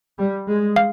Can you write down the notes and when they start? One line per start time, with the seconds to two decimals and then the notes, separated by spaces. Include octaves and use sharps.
0.18 G3
0.48 G#3
0.76 F5